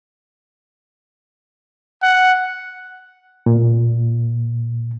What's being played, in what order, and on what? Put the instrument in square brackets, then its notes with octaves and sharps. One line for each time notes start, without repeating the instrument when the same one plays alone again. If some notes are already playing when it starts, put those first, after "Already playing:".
[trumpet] F#5
[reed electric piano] A#2